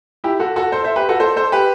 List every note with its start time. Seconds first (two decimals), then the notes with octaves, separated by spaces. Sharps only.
0.24 E4 G4
0.39 F#4 A4
0.56 F#4 A4
0.72 A4 C5
0.84 C5 E5
0.96 G4 B4
1.09 F#4 A4
1.20 A4 C5
1.36 A4 C5
1.52 G4 B4